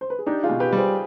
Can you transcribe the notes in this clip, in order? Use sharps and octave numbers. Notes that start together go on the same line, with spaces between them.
C5
B4
G#4
D4 D#4 G4
F4 G#4
B2
G4 B4
G3 G#4 C5